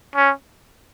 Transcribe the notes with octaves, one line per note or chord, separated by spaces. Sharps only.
C#4